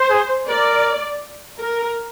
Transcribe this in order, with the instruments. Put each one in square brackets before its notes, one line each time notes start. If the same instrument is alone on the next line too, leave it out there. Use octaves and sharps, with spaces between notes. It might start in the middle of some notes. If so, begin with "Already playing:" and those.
Already playing: [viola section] C5
[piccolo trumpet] G#4
[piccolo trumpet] A#4 [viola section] D5
[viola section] A#4